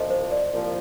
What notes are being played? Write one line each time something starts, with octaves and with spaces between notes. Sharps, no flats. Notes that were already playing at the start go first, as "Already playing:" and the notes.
Already playing: C2 A#2 F3 C5 D#5
C5
D5
C2 A#2 F3